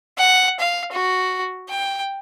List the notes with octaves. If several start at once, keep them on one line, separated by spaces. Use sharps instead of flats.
F#5
F5
F#4
G5